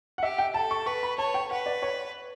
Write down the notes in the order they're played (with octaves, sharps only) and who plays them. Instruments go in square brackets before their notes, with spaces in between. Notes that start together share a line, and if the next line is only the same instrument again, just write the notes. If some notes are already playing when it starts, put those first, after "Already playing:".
[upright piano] F#5
[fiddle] G4 [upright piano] E5
[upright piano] G5
[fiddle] A4 [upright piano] A5
[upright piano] C#6
[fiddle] B4 [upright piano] C#6
[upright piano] B5
[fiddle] C#5 [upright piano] A5
[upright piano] G5
[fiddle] B4 [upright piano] F#5
[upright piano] D5
C#5